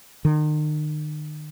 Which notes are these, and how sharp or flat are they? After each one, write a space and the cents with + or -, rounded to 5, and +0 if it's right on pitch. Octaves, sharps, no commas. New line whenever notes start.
D#3 -40